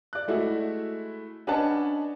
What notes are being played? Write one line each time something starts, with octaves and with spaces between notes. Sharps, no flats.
D5 F#6
G#3 A3 E4 F#4 E5
C#4 D4 B4 D#5 F#5 A5